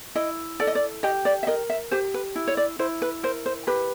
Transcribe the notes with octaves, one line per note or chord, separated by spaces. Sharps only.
E4 D#5
A4 D5
D#5
D5
G4 D#5
D5
E5
A#4 D#5
E5
G4 C5
B4
E4
C#5
D5
E4 C5
B4
A#4 C5
C5
G4 B4